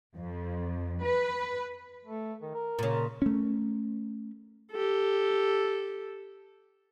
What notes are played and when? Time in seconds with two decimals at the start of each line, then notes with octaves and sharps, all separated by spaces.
0.16 F2
1.04 B4
2.05 A3
2.42 D#3
2.55 A#4
2.79 A#2 C#3
3.22 A3 C#4
4.72 G4 A4